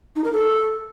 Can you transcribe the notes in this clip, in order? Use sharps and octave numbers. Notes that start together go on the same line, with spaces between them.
D#4
A#4
A4